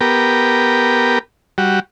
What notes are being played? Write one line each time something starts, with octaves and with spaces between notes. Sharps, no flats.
B3 G4 A#4
G3 F#4